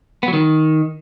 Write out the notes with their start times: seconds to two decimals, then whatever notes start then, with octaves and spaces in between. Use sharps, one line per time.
0.23 B3
0.28 F#3
0.33 D#3